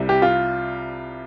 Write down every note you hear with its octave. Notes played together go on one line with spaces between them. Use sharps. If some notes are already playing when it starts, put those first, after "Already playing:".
Already playing: C2 C3 G3
G4
F4